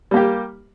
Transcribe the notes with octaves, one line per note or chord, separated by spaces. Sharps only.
G3 A#3 G4